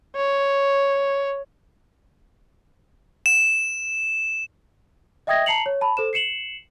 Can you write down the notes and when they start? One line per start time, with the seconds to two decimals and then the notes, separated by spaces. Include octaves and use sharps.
0.16 C#5
3.26 E7
5.27 D#5 E5 G5 D#6 G#6 A#6
5.46 A5 A#5 C7 C#7 F7 F#7
5.66 C#5
5.81 A5 B5
5.97 A4 C5 E7
6.13 C7 C#7 E7 F#7